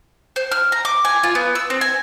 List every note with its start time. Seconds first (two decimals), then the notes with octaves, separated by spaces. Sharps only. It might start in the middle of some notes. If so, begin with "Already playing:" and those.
0.36 C5
0.52 F6
0.72 A#5
0.85 D6
1.05 G#5
1.23 F4
1.35 B3
1.55 E6
1.70 C4
1.81 G#5